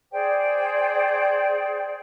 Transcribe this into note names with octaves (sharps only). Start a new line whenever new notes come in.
G#4 C5 D5 G5